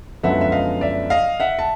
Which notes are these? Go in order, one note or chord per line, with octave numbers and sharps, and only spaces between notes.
F#2 D3 F3 G#3 B3 E5 F#5
E5
D#5 F5
D5 E5
D#5 F5
E5 F#5
A5